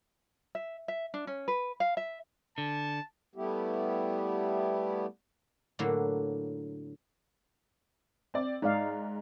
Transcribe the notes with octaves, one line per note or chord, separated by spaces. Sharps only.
E5
E5
D4
C#4
B4
F5
E5
D3 A5
G3 A3 B3 E4 G4
A2 D3 F#3 A#3
C4 D5
G#2 D#4 D5 F5